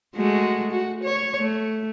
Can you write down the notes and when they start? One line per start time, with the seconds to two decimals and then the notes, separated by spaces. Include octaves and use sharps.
0.16 G#3 A3 F#4
0.71 F#4
1.03 C#5
1.40 A3